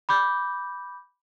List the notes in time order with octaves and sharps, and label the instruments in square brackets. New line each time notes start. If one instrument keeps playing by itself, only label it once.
[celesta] B5 D6 G6